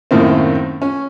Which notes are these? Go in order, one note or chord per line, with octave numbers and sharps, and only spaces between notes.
F#2 A2 D#3 A3 A#3 C4
C#4